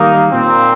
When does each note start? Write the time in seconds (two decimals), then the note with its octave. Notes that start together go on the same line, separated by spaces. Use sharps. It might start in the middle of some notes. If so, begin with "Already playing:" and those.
Already playing: D#3 G3 A#3 D#4
0.30 A#2 A#3 C4